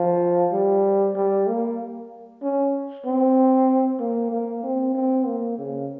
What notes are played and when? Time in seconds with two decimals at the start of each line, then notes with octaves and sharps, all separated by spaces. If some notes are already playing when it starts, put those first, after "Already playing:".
Already playing: F3
0.53 G3
1.16 G3
1.47 A#3
2.42 C#4
3.06 C4
4.00 A#3
4.31 A#3
4.63 C4
4.95 C4
5.26 A#3
5.58 C#3